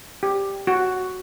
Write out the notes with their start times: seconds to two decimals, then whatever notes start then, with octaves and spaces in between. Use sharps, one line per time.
0.23 G4
0.67 F#4